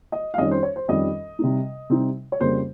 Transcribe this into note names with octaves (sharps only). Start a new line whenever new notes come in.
D#5
F5
F2 D#3 G3 C#4 D#5
C5
C#5
C5
F2 D#3 G3 C#4 D#5
C3 G3 C4 D#4
C3 G3 C4 D#4
C#5
F2 C#3 G3 A#3 C5